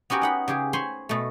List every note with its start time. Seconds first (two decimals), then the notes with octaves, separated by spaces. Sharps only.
0.10 B3 C#4 F#4 G4 A#4
0.22 D#4 F#5 B5
0.48 C#3 G4 G#4
0.73 C5 C#5 G#5 B5 C6
1.09 B2 A3